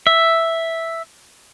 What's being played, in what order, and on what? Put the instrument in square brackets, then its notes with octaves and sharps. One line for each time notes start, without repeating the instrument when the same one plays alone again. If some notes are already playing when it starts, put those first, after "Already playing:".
[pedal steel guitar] E5